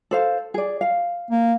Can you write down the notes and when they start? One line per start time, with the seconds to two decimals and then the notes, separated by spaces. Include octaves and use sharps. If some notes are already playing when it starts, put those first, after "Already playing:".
0.11 A4 C5 F5
0.54 G#4 D5
0.81 F5
1.31 A#3